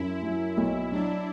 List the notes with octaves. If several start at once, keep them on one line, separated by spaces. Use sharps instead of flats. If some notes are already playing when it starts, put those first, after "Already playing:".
Already playing: F#2 E4
F#3
B1
F#3 D4